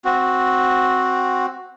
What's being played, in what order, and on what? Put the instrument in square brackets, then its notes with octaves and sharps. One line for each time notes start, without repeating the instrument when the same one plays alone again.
[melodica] C4 F#4